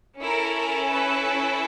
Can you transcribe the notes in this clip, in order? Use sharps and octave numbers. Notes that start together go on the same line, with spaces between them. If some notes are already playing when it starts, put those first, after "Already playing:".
C#4 E4 A4 A#4
A#4
B4